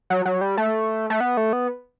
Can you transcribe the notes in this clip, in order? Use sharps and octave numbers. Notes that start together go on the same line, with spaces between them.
F#3
F#3
G3
A3
A3
B3
A3
B3